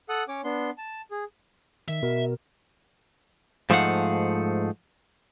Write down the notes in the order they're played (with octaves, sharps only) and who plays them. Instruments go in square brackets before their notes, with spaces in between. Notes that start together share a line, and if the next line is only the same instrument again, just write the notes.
[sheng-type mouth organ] A4 F#5 D#6 F#6
C#4 C#5 D6
B3 D4 C6
A5
G#4
[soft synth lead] D#3 [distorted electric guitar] E5
[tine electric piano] B2 [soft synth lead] A#4
[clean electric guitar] G#2 F3 A3 D#4 F5 F#5